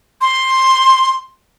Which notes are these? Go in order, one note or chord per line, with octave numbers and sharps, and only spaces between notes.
C6